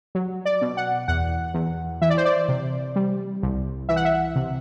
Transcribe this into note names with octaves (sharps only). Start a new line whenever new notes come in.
F#3
D5
B2
F#5
E2 F#5
E2
E3 E5
D5
C5
D5
C3
G3
C2
E3 E5
F#5
E5
C3